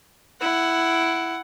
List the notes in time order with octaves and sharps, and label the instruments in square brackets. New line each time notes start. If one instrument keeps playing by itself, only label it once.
[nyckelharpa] E4 F#5